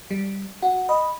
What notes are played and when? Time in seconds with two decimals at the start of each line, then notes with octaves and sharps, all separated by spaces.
0.11 G3
0.62 F#4 F#5
0.89 D#5 B5